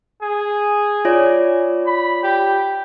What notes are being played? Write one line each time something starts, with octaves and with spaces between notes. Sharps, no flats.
G#4
F4 C#5 D5
B5
G4